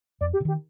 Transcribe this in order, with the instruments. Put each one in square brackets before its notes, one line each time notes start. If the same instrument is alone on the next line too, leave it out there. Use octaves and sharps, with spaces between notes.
[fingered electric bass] F2 [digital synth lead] D5
[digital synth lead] G4
[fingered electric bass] C3
[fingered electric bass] D#3 [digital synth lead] G4